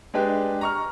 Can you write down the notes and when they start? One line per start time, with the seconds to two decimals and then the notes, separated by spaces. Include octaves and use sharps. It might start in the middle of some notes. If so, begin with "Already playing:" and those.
0.14 G#3 D4 G4 B4 D5
0.61 A#5 C#6 F6